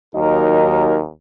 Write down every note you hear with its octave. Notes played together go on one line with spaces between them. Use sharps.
D#2 F#3 D#4 A#4